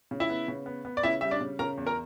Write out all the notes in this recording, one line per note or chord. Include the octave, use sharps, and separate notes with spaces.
C#3
E4 E5
B3
C#3
B3
B3
D5
C#3 E4 E5
G3 E5
D4 D5
C#3
C#3 A#4 A#5
E2
A#4 A#5